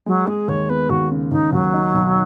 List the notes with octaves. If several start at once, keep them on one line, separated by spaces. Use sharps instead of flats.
F#3 G#3
G#3 G#4
D#2 C#5
B3 B4
D#2 F#4
C#3
D#2 D#4
D#2 F#3
D#4
B1